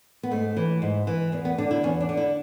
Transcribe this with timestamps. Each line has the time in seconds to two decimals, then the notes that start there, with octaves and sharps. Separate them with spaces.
0.23 B3
0.31 G#2 A3
0.57 E3
0.82 G#2
1.07 E3
1.32 E2 B3
1.45 B3
1.58 D3 D4
1.71 E4
1.83 E2 C#4
2.00 D4
2.09 D3
2.17 E4